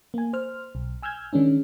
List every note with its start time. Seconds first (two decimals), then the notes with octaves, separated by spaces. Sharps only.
0.14 A#3 G#5
0.33 C5 F6
0.75 B1
1.03 G#5 E6 F6 G6 G#6
1.33 D#3 G#3 C#4 D4